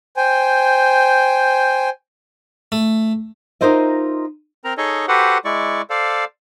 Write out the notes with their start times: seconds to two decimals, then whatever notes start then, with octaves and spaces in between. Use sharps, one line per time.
0.17 C5 G5 G#5
2.72 A3
3.61 D#4 F4 A#4 C5 D#5 E5
4.64 C4 A#4 A#5
4.78 D#4 G#4 A4 C#5 D#5
5.08 F#4 G4 A4 B4 C5 F#5
5.45 G#3 E4 D5 C#6
5.90 A4 C5 D5 F5